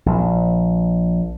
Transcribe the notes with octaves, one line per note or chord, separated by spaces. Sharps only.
A#1